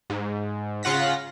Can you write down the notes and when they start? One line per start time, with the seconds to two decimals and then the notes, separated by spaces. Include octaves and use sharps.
0.10 G#2
0.83 C#3 F4 F#5 A#6 B6